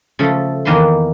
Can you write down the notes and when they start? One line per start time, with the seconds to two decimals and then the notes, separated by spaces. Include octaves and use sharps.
0.19 C#3 F3 A3 A4
0.65 E2 D#3 A#3 B4 C6